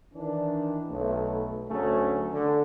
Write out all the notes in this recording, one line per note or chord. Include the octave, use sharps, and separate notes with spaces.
D#3 E3 D4
B1 A3
D2 F#3 A3 C#4 G#4
D3